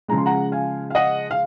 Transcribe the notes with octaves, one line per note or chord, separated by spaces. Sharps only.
C#3 F3 G#3 A#5
C6
F#5 A#5
F5 G#5
F5
D#5 F#5
F5